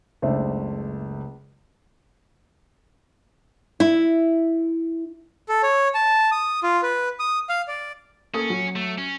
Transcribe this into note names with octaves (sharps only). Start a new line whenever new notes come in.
F#1 C#2 A3 D4 C5 E5
E4
A4
C#5
A5
D#6
F4
B4
D#6
F5
D5
A#3 C#4 A4 D#6
F#3
A3
C#4